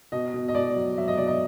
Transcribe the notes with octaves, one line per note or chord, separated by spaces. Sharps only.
B2 D#5
B2
D#5
B2 D5
F#3
F#3 E5
D#5
B2 D5
D#5